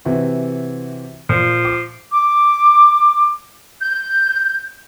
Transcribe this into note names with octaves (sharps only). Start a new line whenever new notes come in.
C3 E3 F#4
A#2 F3
D6
D6
G6